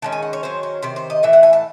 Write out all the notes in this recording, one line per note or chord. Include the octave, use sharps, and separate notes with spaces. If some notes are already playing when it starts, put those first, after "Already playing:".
D#3 G#3 C#4 A5
G#5
F#5
C#5
D#3 F#3 C#4 C5
C5
C3 D#3 C5
C5
D#5
A2 E3 E5
F#5
G#5
A5